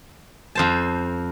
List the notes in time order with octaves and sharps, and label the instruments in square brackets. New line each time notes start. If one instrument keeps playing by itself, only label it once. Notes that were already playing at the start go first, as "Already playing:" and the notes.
[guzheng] F2 C5 A5